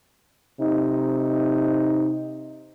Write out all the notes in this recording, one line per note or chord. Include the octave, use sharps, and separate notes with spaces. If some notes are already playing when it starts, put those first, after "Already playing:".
C3 D#4